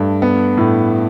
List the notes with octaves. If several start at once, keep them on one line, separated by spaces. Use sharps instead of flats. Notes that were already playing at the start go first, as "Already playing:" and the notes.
Already playing: G2 A3
B3
A2